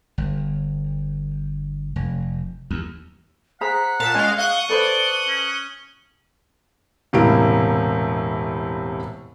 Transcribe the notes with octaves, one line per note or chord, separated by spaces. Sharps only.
G1
F1
D#2
G#4 C5 F#5 A#5 B6
A#2 F5 A5
G#3 C#4 F5 C6
F5 C#6 D#6 F#6 G7
A4 B4 C5 D5
C#4
E1 A2 C3 A#3 D7